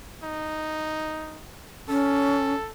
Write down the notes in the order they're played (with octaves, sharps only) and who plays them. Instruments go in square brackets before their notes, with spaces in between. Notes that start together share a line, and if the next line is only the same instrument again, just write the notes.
[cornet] D#4
[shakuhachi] C#4 [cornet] A4